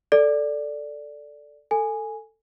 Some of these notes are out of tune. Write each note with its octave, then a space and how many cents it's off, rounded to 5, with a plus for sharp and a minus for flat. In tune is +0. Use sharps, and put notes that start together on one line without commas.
A4 +0 D5 +0
A4 +15 G#5 +0